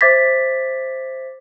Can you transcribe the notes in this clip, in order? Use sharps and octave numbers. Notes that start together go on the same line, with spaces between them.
C5 E5 D6 G#6 A6 B6